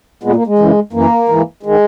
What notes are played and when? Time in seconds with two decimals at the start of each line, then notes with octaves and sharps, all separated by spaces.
0.23 A#2 G#3 B3
0.35 A#3
0.47 G#3
0.59 F#2 C#3 E3
0.93 F#2 E3 A#3
1.29 G#2 E3
1.63 D#3 G#3